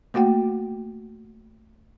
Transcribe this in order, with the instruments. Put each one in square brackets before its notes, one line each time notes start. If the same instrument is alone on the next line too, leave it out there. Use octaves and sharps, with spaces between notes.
[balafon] A3 A#3 F#4 F#5 G5